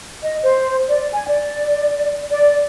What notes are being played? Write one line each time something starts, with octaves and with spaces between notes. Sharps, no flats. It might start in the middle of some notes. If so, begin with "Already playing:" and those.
D#5
C5
D5
G#5
D5
D5